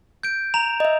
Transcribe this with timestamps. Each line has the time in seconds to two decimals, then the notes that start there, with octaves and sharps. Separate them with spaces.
0.23 G6 D7
0.54 A#5 E7 F7
0.80 D#5 E5